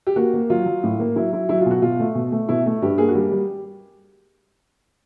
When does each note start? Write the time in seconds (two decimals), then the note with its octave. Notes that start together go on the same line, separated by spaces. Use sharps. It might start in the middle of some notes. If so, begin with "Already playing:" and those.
0.07 G4
0.16 A#3 F#4
0.34 A#3
0.50 F#3 F4
0.66 F#3
0.83 A2
1.00 A#3
1.16 F#3 E4
1.33 F#3 E4
1.49 F#3 E4
1.61 F4
1.66 B2 F#4
1.82 B2 F4
2.00 A3
2.15 B2
2.32 A3
2.49 B2 E4
2.66 A3
2.82 G2 G4
2.98 A#3 G#4
3.08 F#4
3.15 G3 G4
3.31 G3